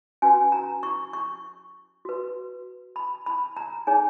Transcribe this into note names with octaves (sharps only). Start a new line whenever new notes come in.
C#4 F#4 B4 G#5
A#5
C#6
C#6
F#4 B4
B5
B5
A#5
D#4 G#4 C#5 G#5